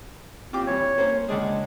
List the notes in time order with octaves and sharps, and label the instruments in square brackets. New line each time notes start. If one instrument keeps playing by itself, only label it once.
[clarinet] C4 [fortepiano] F4 G4 D6
[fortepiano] E3 G3 [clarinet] C#5
[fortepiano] A#3 C#4 C5
[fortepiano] C#2 D4 G#4 [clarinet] G#3